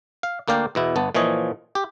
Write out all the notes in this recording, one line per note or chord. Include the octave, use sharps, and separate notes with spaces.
F5
D2 A#3 D5 F5 G5
E2 B2 E4
G1 B3 A5
A#2 E3 F3 C#5 D#5
G4